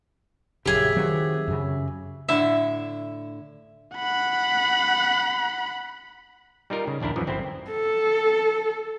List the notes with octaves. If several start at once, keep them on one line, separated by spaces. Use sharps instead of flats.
A#1 F#2 C#3 G4 G#4 E5
D#3 F#3 C4
F#2 C#3
A2 D3 E4 E5
F#5 B5
G3 D#4 F4 A#4
C#3
A#1 D#2 D4 E4 A#4
F#2 E3 F3
G1 C4 E4 C5
A4